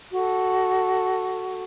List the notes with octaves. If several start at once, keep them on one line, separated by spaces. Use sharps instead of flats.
F#4 A4